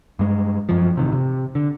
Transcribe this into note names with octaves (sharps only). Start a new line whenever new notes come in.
G2 G#3
F#2 F3
A1 C3 D#3
C3
D3